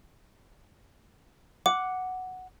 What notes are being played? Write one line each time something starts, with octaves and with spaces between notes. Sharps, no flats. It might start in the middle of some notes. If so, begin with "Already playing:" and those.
F#5 D6